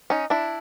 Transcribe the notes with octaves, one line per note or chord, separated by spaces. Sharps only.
C#4 D#4
D4 E4